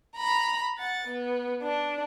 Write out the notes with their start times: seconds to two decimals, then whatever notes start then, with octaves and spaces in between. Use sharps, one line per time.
0.16 A#5 B5
0.78 F#5 A6
1.07 B3
1.63 D4